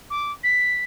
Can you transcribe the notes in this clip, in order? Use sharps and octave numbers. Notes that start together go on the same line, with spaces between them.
D6
B6